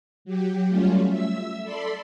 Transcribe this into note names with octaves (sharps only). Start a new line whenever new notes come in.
F#3 G4
F#3 G3 A3 C#4 F4
E5 E6
A4 D5 B5 C6